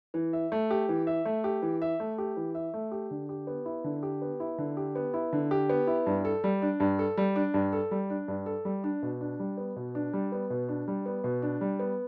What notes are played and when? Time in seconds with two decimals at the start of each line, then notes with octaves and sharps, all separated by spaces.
0.14 E3
0.33 E5
0.52 A3
0.71 G4
0.89 E3
1.07 E5
1.25 A3
1.44 G4
1.62 E3
1.82 E5
2.00 A3
2.18 G4
2.37 E3
2.55 E5
2.74 A3
2.92 G4
3.11 D3
3.29 G4
3.47 B3
3.65 E4
3.84 D3
4.03 G4
4.22 B3
4.40 E4
4.58 D3
4.77 G4
4.96 B3
5.14 E4
5.33 D3
5.51 G4
5.70 B3
5.87 E4
6.06 G2
6.25 A4
6.44 G3
6.62 D4
6.80 G2
6.99 A4
7.17 G3
7.36 D4
7.54 G2
7.73 A4
7.91 G3
8.10 D4
8.28 G2
8.46 A4
8.65 G3
8.84 D4
9.03 B2
9.21 D4
9.39 G3
9.58 B3
9.76 B2
9.95 D4
10.13 G3
10.32 B3
10.50 B2
10.69 D4
10.88 G3
11.06 B3
11.24 B2
11.42 D4
11.61 G3
11.80 B3